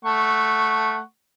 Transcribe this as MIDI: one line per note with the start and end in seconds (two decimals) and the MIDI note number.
0.05 1.01 57
0.05 1.01 78
0.05 1.01 85